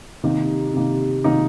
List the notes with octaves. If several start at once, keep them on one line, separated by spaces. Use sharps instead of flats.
C3 D#3 A#3 D#4
C3 D#3 A#3 D#4
C3 D#3 A#3 D#4